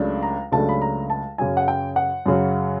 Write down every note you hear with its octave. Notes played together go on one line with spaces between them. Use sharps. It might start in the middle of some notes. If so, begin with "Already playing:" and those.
Already playing: C#2 C#3 F#3 A3 D4
A#5
C#2 C#3 F#3 A3 D4 A5
B5
A#5
A5
F#2 C#3 F#3 G#5
F#5
G5
F#5
F#2 C#3 F#3